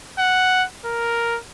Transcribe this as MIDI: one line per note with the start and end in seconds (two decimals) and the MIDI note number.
0.19 0.65 78
0.85 1.39 70